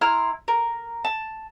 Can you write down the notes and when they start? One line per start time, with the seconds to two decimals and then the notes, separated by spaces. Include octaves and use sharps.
0.01 E4 A#5 C6 F6
0.48 A#4
1.05 A5